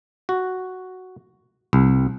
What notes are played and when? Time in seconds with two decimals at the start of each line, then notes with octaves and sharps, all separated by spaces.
0.29 F#4
1.73 C2